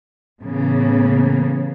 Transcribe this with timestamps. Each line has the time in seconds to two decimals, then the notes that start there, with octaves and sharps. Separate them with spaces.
0.42 A2 C#3 E3 A#3 B3